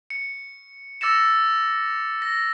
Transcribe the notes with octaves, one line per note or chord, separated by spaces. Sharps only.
C#7
D6 E6 A6 A#6 C#7 E7
A#6